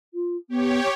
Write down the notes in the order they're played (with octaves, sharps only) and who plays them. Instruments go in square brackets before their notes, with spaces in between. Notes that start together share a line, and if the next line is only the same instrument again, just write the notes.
[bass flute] F4
[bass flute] B3 [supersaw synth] G4 C#5